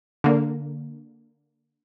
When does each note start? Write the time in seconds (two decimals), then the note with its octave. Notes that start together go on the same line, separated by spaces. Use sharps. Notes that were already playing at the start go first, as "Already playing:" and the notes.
0.24 D3 A#3